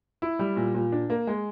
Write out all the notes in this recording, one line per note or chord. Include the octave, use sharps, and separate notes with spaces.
E4
G3
A#2
A#2
D4
A#3
G#3